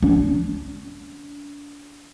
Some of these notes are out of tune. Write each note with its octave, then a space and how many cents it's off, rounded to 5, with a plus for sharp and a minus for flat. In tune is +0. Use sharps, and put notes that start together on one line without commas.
D4 -30